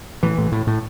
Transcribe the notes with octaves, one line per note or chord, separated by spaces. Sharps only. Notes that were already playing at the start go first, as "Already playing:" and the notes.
A2 E3
A2
A2
A2